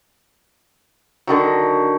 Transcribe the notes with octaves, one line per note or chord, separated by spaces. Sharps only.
D3 D#3 F#3